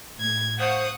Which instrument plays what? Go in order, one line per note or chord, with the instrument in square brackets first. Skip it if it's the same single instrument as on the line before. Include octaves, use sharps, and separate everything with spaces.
[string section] A2 [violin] G#6
[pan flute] C5 [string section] F5 F#5 C#6 [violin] D#6